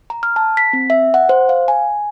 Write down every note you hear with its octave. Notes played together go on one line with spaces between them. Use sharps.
A#5
F6
A5
B6
C4
E5
F#5
C5
F5
G#5